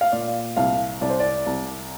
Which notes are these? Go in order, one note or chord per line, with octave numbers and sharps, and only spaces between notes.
F5
A#2 D5
C2 F5
C2 D5
C5
D5
C2